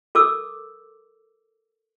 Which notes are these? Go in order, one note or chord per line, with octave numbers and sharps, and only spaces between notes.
A4 A#4 D6 E6